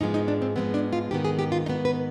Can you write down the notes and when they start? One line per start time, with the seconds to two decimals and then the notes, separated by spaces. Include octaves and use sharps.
0.01 G#2 F3 G#3 B3 D#4
0.14 D#4
0.28 D4
0.42 C4
0.56 G#2 F3 G#3 B3 C4
0.74 D4
0.93 F4
1.11 G#2 D#3 B3 G4
1.25 G#4
1.39 G4
1.52 F4
1.66 G#2 D#3 B3 D#4
1.85 B4